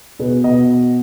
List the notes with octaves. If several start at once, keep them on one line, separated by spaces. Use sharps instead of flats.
B2 G#4 B4
B2 D#5